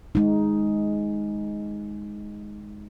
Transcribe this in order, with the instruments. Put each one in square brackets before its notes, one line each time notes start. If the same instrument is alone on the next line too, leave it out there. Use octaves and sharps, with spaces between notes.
[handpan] G#3 D#4